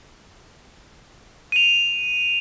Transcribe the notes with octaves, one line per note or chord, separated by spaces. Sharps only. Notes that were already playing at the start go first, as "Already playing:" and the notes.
D#7 F7